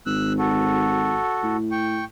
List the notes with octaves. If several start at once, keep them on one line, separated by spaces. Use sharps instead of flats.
G#1 E6 F#6
F#4 A4
A2
G5 C#6